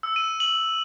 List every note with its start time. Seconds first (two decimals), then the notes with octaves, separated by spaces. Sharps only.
0.03 E6
0.16 D#7
0.40 F#7